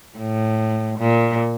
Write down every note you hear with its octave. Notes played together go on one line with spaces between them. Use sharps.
A2
A#2